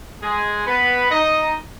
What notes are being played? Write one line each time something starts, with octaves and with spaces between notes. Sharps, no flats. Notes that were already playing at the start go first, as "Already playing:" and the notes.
G#3 G#4
B3 B4
D#4 D#5